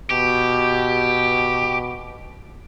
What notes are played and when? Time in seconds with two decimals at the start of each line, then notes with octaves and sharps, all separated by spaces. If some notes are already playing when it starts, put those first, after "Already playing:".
0.11 B2 G4